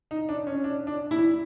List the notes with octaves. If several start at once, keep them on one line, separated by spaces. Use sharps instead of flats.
D#4
D4
C#4
D4
D4
E4